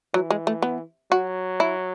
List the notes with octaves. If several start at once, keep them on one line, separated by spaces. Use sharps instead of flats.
E3 F#3
G#3
A3
B3
F#3 F#4
E4